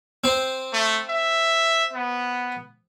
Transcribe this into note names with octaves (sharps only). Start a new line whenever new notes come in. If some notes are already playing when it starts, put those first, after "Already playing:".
C4 C5
A3
E5
B3